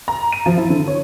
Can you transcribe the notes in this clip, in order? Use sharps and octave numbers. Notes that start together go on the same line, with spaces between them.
A#5
D#7
F3
E4
D3
C#5